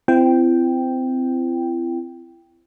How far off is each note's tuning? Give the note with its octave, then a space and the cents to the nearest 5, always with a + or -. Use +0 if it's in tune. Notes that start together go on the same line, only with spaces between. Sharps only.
C4 -20 E4 +40 G5 +0